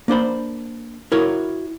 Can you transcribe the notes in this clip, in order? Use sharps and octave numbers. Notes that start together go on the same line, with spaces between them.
A#3 D4 C5 B5
E4 F#4 A#4 C#5